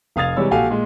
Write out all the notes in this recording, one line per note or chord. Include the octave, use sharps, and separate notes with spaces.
F1 F5 D#6 G#6 A6 F7
C3 E3 G3 G#3 C#5 E6
A#1 F#4 G4 A4 F5 G#5
A#2 G#3